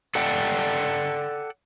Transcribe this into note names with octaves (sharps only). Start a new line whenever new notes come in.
A4 D5 F#5 G5